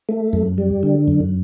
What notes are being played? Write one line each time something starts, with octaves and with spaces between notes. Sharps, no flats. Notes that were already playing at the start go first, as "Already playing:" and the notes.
A3
F#2
G3
D3
F#2